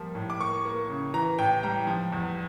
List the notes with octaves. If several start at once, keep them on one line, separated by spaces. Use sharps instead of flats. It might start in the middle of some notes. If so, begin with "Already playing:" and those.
Already playing: F3 G3 A#3
A2
D6
A#3 C#6
A#3
C#3
E3 A#5
A2 G5
G3 A#5
F3
E2